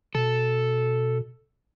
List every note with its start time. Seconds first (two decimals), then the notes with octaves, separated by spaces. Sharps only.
0.15 B2 A4